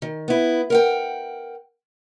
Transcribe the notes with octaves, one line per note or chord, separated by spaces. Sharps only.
D#3
B3 E4
A#4 F#5 G5